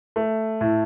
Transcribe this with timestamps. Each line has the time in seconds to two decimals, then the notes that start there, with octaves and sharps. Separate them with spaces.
0.16 A3
0.61 A2